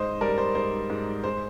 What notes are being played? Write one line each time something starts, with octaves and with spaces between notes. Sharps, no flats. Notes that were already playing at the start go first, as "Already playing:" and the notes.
Already playing: G#2 C5 D#5
G3 A#4 D5
C5
G#2 C5
G#2
G#3 C5